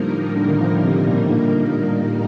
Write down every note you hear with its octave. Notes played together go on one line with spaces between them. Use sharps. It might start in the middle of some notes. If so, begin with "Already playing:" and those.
Already playing: A2 D3 F3 G3 A#3 D#4 A#4
D3
D#3
D3 F3
C3 D#3
A#2 D3
C3
A#2 D3